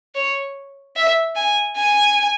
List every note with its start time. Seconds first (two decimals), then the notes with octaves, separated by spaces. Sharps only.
0.15 C#5
0.96 E5
1.36 G#5
1.77 G#5